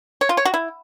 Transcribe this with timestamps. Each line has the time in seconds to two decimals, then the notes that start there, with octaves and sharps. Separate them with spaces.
0.21 C#5
0.29 F4
0.37 C#5
0.45 F#4
0.54 E4